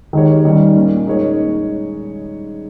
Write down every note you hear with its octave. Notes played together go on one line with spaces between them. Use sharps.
D#3 G#3 D#4 G4 C#5
D#3 G3 C#4
A#2 A#3 C#4
G#3 D#4 G#4 C#5